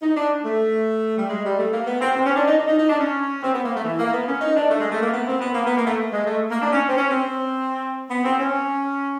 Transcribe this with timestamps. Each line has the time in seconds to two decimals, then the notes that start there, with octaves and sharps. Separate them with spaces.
0.02 D#4
0.17 D4
0.45 A3
1.18 G3
1.29 G#3
1.45 G3
1.58 A3
1.72 A#3
1.86 B3
2.01 C4
2.15 C4
2.25 C#4
2.36 D4
2.47 D#4
2.58 D4
2.67 D#4
2.78 D#4
2.89 D4
2.99 C#4
3.43 C4
3.53 B3
3.64 A#3
3.75 A3
3.84 E3
3.98 A#3
4.13 B3
4.28 C#4
4.41 D#4
4.56 D4
4.70 A3
4.80 G#3
4.92 A3
5.01 A#3
5.12 B3
5.27 C4
5.40 B3
5.54 A#3
5.66 B3
5.77 A#3
5.87 A3
6.12 G#3
6.26 A3
6.51 A#3
6.62 D4
6.72 C#4
6.88 C4
6.97 C#4
7.11 C4
8.10 B3
8.24 C4
8.39 C#4